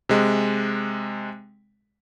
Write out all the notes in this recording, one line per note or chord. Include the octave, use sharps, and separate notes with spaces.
C3 G#3